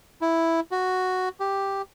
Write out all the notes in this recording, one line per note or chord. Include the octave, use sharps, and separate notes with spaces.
E4
F#4
G4